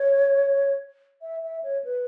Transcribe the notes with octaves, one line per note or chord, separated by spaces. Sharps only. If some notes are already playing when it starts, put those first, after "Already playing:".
Already playing: C#5
E5
E5
C#5
B4